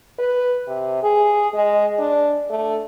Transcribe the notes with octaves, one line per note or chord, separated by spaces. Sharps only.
B4
C3
G#4
G#3
D4
A3